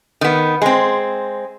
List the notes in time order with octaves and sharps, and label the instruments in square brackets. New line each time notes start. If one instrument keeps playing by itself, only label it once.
[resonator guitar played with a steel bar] D#3 B3
G#3 C4